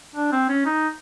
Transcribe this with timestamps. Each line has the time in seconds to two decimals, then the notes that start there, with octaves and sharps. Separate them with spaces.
0.15 D4
0.32 C4
0.49 C#4
0.66 D#4